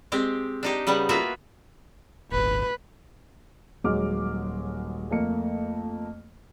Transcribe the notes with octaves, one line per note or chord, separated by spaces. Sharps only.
G#3 C4 G4
D4 D#4 G4
C#3 G3 B3 F#5
A#3 B3 F4 F#4 E5
D#1 G#1 B4
D#1 F#3 G#3 D#5 D6 F6
F2 A3 A#3 C#7